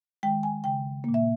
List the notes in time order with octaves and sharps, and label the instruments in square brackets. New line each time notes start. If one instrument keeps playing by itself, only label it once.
[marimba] D#3 G#3 G5
G#5
C#3 G#3 G5
A#2 A#3
E5